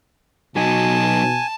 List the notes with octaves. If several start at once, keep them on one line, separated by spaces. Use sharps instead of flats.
B2 F#3 D#4 G#5 A5